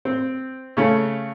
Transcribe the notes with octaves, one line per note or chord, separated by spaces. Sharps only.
C4
C#3 A3 C#4